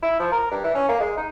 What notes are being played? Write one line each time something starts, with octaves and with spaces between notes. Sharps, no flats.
E4
F3
A#4
G2
E3
C#4
A#3
G#3
D#4